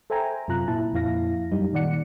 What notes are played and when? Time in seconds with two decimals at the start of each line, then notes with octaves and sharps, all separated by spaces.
0.10 A4 C5 E5 G5 G#5 A#5
0.48 F#2 C3 F4 A#5 F#6
0.68 A#2 E4 A5
0.93 F2 A#2 E4 F5 A#6
1.52 F#2 G3 D#4
1.73 A#2 D#3 D5 F#5 C#7